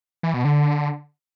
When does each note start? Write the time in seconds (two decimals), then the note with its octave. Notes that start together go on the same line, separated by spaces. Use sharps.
0.23 E3
0.34 B2
0.45 D3